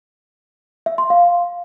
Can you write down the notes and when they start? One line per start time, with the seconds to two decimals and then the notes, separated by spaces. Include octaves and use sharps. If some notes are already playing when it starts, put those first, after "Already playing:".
0.86 E5
0.98 C6
1.10 F5